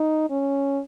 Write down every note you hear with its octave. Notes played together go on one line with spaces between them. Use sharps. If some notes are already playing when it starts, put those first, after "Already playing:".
Already playing: D#4
C#4